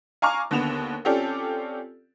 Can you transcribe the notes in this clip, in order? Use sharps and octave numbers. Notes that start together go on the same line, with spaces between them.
F5 G#5 A#5 C#6 D6 F6
D#2 D3 B3 E7 F7
C4 C#4 F4 G4 A4 D5